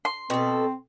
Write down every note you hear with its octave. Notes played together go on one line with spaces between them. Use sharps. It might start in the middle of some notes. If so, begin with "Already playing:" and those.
C6
B2 C4 A4